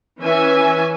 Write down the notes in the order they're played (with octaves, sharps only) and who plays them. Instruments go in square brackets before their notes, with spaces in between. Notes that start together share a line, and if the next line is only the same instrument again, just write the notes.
[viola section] E3 C#4 E5 G#5